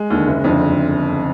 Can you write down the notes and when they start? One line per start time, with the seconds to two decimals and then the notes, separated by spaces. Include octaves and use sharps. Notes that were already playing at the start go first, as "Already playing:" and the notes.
Already playing: G#3
0.10 D#2 D3
0.27 F#1
0.44 F2 D3